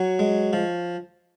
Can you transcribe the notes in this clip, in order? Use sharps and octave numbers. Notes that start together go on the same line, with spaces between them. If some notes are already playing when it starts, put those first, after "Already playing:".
Already playing: F#3 C#5
G#3
F3